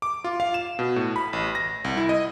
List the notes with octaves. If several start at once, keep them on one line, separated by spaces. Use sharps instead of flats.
D6
F4
F5
E7
B2
A2
B5
A1
A#6
C2
E4
D#5